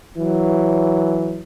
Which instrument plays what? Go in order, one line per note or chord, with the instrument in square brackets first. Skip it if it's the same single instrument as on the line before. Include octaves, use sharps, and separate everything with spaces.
[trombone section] E3 F#3